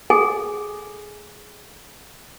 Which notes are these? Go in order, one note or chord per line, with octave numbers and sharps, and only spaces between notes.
G#4 A4 G#5